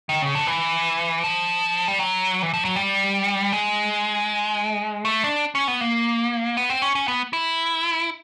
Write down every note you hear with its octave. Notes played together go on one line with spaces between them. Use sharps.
D#3
C#3
D3
E3
F3
G3
F#3
E3
F3
F#3
G3
G#3
A3
D4
C#4
B3
A#3
B3
C4
C#4
C#4
B3
E4